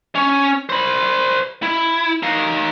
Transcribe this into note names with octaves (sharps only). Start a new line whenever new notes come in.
C#4
C5 B5
E4
D#4 F5